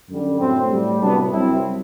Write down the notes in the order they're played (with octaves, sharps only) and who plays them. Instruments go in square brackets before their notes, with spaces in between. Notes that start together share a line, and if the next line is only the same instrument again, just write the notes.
[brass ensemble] F#2 D3 G3
A2 F#3 A3 C4
A2 G3
C2 C3 F#3 B3 D4
C2 C3 F#3 C4 E4